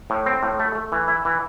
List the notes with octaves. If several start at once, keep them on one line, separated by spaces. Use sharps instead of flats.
A2
C4
A2
A3
A3
E3
E4
E3